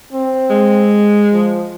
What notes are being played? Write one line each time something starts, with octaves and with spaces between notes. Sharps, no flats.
C4
G#3
F3